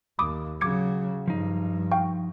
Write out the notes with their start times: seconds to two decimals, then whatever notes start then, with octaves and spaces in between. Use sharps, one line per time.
0.19 D#2 B5 D6 D#6
0.61 C#3 F#3 D6 G#6 C#7
1.28 G2 F3 D#4
1.92 F5 G5 C#6